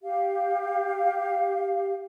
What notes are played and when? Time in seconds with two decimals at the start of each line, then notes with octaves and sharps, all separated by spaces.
0.02 G4 F5